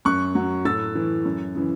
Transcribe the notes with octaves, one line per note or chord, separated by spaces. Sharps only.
F#2 C#6 F#6
F#3
A2 E6 A6
E3
F#2
C#3 E3